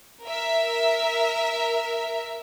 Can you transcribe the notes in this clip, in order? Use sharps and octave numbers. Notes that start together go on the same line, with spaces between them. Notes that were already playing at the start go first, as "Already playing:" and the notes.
A#4 E5